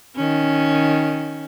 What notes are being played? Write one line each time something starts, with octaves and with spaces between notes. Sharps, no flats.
D#3 C#4